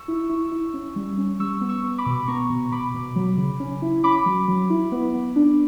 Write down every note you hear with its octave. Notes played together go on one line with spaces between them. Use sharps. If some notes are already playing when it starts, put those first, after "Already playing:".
Already playing: C#6 E6
E4
E4
E4
C#4
G3
C#4
G3 C#6 E6
B3
C#6 E6
B3
B5 D6
B2
B3 A#5 C#6
B2
B2 B5 D6
B2
F#3
C#3
C#4
E4
C#4 B5 D6
F#3
F#3
E4
B3
B3
D4